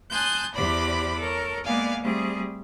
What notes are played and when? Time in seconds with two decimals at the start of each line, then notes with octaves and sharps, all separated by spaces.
0.10 G#5 A5 C6 D#6 F#6 G6
0.54 E2 G4 C5 D5 B5 D6
1.17 A4 A#4 C#5
1.64 G#3 A#3 B3 D5 F5 G#5
2.01 G3 A3 C4 G#4